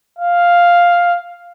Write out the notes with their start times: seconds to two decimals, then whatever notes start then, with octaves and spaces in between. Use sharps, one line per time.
0.19 F5